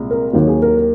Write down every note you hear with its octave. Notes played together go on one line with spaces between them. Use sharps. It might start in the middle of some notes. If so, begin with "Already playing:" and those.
Already playing: C2 A#2 G#3
A#4
D#2 D#3 F#3 A#3
G#4
A#4
A#4